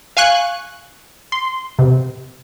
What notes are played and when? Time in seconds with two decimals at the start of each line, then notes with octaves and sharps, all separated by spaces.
0.17 F5 G#5 C#6 F#6
1.32 C6
1.79 C3